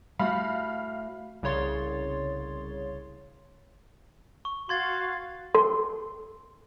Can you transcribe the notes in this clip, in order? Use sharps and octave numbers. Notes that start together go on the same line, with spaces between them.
A2 G3 A3 F#4 F5 B5
C2 C#3 C#5 C6 A6
C#6
F#4 F5 C6 G#6 A6
A4 C6